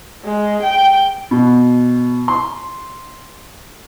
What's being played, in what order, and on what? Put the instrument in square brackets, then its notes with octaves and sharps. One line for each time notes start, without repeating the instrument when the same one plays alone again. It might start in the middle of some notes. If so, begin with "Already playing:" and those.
[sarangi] G#3
G5
[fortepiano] B2
C6